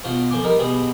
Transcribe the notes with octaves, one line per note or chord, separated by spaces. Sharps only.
B2 F4 F#4 C5
F2 C5 G#5 C6 D6
G3 D#4 A#4 D#5
B2 G3 G#3 B3